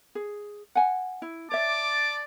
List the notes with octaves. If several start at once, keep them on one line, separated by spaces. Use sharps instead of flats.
G#4
F#5 G#5
E4
C#5 D5 E5 A5 D6